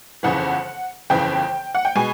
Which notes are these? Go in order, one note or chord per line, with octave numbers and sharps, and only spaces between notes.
G1 F2 C#3 E3 F#5
G1 F2 C#3 E3 G5
F#5
G5
B2 G#3 G#5